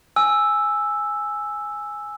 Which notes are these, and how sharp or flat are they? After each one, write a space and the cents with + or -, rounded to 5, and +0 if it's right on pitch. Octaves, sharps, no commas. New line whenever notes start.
G#5 +0 E6 +0